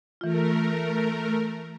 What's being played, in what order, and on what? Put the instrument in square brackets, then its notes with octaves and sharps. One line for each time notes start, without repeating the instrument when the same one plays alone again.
[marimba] E3 F4 [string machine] A3 A#4